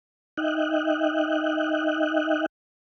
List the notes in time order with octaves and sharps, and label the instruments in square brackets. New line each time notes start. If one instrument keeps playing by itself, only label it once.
[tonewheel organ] D#4 D#5 E5 G5 F#6